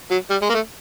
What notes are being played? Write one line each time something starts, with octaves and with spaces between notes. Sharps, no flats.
F#3
G3
G#3
A#3
A3